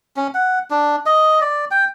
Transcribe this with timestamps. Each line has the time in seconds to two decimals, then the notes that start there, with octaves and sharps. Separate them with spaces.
0.16 C#4
0.34 F#5
0.70 D4
1.06 D#5
1.41 D5
1.71 G5